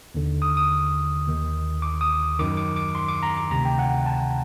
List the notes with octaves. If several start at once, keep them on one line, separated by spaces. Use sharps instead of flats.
D#2 D3
D#6
D#6
D#2 D#3
D6
D#6
F#2 D#3 D6
D6
D6
C6
D6
A#5
D6
D2 C3 D#3 A#5
G5
F#5
A5